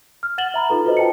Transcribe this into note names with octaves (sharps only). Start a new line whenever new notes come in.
F6
F#5 A6 E7 F#7 G7
E5 A#5 B5
D#4 F4 A4 B4 A#5
F4 F#4 A4 B4 C5 D#5
G5 A5 C#7